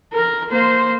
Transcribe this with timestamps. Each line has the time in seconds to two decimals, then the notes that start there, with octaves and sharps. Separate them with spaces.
0.13 A#4
0.50 A#3 C5